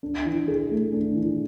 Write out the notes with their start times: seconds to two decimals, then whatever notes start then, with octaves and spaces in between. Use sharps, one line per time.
0.03 D4
0.25 E3
0.48 G#4
0.71 A3
0.93 D4
1.15 E3